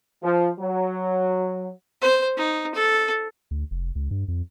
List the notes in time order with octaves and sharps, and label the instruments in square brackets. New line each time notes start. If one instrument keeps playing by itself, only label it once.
[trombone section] F3
F#3
[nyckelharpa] C5
D#4
A4
[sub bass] D2
F1
C#2
G2
F2